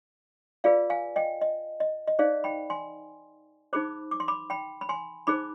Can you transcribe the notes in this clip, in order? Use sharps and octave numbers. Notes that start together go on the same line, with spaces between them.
F4 G#4 B4 D5 F5
F5 G#5
D#5 G5
D#5
D#5
D#5
D#4 G#4 C5 D5 F5
G5 B5
G#5 C6
D#4 G#4 C5 B5 D6
D6
C6
B5 D6
G5 B5
B5
G#5 C6
D#4 G#4 C5 B5 D6